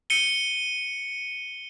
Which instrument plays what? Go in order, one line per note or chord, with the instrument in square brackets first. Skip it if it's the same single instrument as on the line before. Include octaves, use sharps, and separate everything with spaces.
[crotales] C#7 D#7 G7